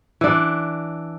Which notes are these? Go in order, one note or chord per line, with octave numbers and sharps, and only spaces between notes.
E3 D4